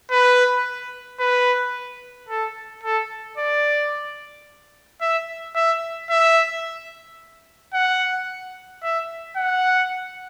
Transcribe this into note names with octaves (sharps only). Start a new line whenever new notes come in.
B4
B4
A4
A4
D5
E5
E5
E5
F#5
E5
F#5